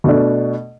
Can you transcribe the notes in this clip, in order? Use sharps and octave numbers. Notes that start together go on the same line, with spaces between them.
B2 A3 D4